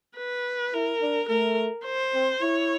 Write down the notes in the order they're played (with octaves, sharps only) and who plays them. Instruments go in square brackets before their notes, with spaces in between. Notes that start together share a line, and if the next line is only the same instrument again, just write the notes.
[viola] B4
[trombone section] E4 [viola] A#4
[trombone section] D4
[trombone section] A3 [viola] A#4
[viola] C5
[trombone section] C4
[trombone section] E4 [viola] C#5